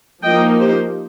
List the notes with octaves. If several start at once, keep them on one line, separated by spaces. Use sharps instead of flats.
F3 A#3 D#4 D#5 G5
G4 C5